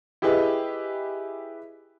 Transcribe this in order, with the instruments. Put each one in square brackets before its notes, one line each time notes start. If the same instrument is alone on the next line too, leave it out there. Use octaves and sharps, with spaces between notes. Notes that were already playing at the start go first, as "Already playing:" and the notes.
[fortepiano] E4 G4 G#4 B4 D#5